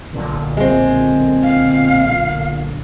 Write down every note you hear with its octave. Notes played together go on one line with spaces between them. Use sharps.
B1 A#2 D3
G#3 C4
F5